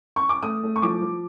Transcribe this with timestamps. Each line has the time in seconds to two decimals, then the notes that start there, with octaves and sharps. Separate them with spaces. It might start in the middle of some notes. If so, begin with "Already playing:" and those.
0.16 C#6
0.29 D6
0.43 A3 D#6
0.63 A3
0.76 C#6
0.82 F3 D6
1.02 F3